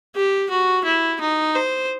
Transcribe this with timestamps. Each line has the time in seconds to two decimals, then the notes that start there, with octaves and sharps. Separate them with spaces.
0.16 G4
0.50 F#4
0.85 E4
1.21 D#4
1.55 C5